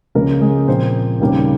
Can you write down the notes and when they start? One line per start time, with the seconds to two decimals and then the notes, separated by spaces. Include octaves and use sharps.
0.15 C#2 C#3 F3 G#3 A#3 A#4
0.41 G#3 G#4
0.68 A#2 F3 A#3 C4 C5
1.20 D#2 C#3 G3 A#3